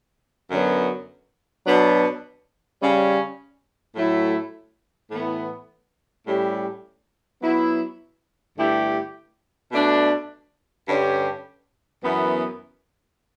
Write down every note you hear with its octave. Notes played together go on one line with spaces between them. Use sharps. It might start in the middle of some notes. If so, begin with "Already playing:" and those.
F#2 D3 F#3 B3
B2 F#3 B3 D4
C#3 G3 C#4
A2 F#3 A3 E4
A2 E3 B3
A2 G3 C#4 G4
F#3 B3 E4
G2 D3 A3 E4 G4
B2 A3 D4
G2 D3 G3 C#4 G4
F#2 E3 B3